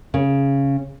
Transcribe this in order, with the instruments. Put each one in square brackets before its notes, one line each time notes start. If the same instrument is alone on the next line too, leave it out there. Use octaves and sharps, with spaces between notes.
[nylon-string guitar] C#3